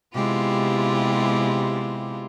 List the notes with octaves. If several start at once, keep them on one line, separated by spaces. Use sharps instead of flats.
C3 G#3 B3 E4 F4 G4